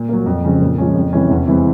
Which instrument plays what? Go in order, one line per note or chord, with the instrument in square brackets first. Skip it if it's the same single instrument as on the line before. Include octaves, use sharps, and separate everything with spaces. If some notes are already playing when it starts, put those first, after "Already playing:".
Already playing: [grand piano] A#2
F#3 A#3
F2
C#3 F3 G#3 C4
A#2
F3 G#3 C#4
F2
C3 E3 G#3 C#4
E2
C3 E3 G#3 C4